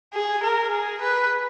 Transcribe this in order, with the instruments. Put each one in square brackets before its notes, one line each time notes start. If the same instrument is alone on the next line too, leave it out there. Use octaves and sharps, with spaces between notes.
[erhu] G#4
A#4
G#4
B4